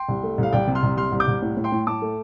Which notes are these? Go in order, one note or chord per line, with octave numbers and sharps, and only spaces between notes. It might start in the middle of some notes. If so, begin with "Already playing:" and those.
Already playing: G5 C6
C2
A3
C2 F5
C2 D5 G5
C3
C6 F6
C2
C3 C6 F6
C2
D6 G6
C2
A2
A2
G5 C6
A2
A2 A5 D6
A3